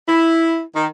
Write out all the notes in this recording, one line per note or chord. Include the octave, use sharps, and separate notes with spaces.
E4
D#3